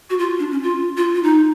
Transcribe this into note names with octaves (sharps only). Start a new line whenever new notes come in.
F#4
F4
D4
C#4
F4
F4
F4
D#4